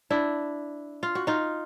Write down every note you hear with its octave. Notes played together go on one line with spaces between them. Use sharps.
D4 E4
F4
F#4
D#4 F4